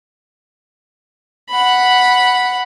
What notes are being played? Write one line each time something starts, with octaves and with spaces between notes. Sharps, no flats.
F#5 B5